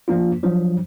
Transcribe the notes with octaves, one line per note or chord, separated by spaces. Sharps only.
F3 A#3 D4 F4
F3 F#3 D4